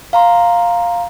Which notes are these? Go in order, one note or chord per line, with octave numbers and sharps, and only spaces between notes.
F5 A#5 C6